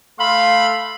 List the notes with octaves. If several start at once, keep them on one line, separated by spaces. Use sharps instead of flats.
A3 F5 B5 C6